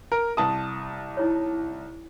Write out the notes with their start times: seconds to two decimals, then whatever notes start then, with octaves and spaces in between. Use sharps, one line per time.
0.12 A#4
0.37 C2 A5 D#6
1.17 D#4 E4 C#5